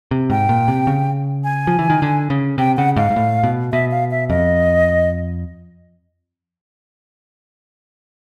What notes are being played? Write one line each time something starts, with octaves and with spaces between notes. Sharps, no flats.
C3
G#2 G5
A#2
C3
C#3
G#5
F3
E3
D#3
D3
C#3
C3 G5
C#3 F#5
G#2 F5
G#2
A2
B2
B2 E5
F5
E5
F2 D#5